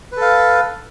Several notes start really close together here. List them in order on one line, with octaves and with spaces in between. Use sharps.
B4 A4 F5